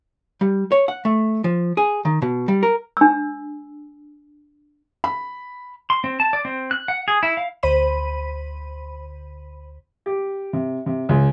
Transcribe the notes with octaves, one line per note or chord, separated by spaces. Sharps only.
G3
C#5
F#5
A3
F3
G#4
D#3
B2
G3
A#4
D4 E6
B5
C6
C4
A5
D5
C4
F#6
F#5
G#4
E4
F5
D2 C5 B5 D#7
G4
C3
C3
C#2